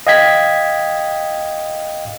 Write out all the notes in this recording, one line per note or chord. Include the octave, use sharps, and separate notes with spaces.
D#5 F5 G5 G#6 B6